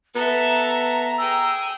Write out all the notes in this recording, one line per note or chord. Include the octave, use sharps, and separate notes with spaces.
B3 A4 E5 A#5
G#4 G5 E6